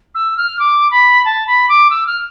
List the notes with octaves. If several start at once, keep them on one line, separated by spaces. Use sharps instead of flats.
E6
F6
D6
B5
A5
B5
D6
E6
F6